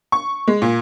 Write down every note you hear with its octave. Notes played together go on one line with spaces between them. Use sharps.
C#6
G#3
A#2